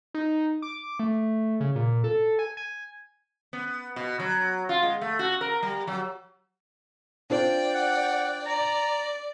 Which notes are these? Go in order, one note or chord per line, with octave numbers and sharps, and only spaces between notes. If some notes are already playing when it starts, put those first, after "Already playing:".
D#4
D6
A3
C#3
A#2
A4
G#5
G#5
B3
B2
F#3
F4
G#3
A3
F#4
A#4
G3
F#3
D4 F4 C5 D5 G5
F#5
D5 A#5